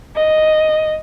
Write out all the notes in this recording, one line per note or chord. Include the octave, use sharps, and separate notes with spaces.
D#5